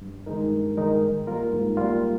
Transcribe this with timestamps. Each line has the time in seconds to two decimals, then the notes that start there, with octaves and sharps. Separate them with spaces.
0.01 G2
0.26 D#3 G#3 D#4 A#4
0.52 G2
0.77 D#3 G#3 D#4 A#4
1.02 G#2
1.27 G3 A#3 F4 A#4
1.52 G#2
1.77 G3 A#3 F4 A#4